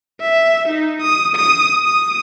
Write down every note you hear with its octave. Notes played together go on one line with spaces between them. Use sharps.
E5
D#4
D#6
D#6
D#6